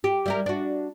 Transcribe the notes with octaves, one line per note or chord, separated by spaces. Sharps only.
G4
G3 E4 A#4
D4 F#4